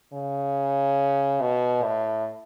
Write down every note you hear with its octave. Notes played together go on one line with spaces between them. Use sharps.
C#3
B2
A2